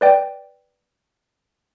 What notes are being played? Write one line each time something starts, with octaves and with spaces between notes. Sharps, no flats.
B4 D5 G5